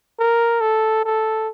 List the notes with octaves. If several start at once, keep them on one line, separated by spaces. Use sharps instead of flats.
A#4
A4
A4